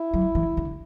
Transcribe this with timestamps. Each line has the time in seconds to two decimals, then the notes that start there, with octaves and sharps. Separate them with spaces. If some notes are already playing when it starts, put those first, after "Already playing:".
Already playing: E4
0.14 F#3
0.35 E3
0.57 D3